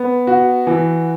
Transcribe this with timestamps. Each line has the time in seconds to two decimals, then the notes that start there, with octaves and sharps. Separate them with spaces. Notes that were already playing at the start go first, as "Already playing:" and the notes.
Already playing: B3
0.27 F#4
0.67 E3